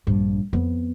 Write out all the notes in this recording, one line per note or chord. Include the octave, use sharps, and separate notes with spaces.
A#1 G2
F2 B3